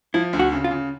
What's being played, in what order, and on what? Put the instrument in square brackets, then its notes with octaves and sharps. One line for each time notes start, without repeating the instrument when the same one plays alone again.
[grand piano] F3 [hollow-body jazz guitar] E4
[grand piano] D2
[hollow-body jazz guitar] F#4
[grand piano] C#3
[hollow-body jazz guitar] F4
[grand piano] C#3